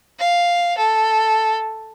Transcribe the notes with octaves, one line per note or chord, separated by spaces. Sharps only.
F5
A4